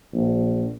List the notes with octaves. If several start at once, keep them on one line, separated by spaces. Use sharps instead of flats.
A#1